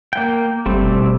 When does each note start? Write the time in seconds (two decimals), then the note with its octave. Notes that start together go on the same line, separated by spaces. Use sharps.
0.13 A#3 G5
0.66 F#1 G3 A3 C4
0.85 B2